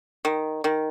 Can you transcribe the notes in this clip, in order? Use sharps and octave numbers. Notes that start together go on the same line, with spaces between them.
D#3
D#3